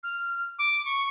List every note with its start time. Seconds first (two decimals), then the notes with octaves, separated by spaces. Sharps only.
0.03 F6
0.59 D6
0.85 C#6